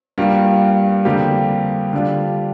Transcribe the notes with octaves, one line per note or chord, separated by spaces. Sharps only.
G2 G3 A#3 F4
F2 D3 G3 A#3 G4
D3 G3 D4 F4